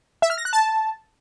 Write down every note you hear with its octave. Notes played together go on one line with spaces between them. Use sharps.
E5
F6
A#6
F#6
A5